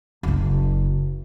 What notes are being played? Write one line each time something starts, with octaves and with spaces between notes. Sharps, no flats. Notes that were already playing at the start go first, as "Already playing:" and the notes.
F#1 C#3